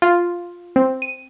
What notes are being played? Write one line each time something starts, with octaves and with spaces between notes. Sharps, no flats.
F4
C4
D#7